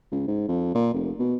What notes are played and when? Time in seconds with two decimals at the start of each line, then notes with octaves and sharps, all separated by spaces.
0.11 C#2
0.27 G#2
0.48 F2
0.74 A#2
0.94 F1
1.19 B2